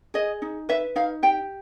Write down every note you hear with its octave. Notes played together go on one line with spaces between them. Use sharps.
G#4 D#5
D#4
B4 E5
D#4 F5
G4 G5